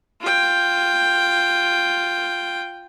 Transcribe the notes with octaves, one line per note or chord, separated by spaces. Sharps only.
F4 G5